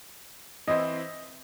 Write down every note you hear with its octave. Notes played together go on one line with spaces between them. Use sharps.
E3 C4 E4 C5 D#5